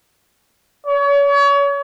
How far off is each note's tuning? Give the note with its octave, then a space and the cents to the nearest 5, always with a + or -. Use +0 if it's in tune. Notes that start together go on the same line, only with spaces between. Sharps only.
C#5 +35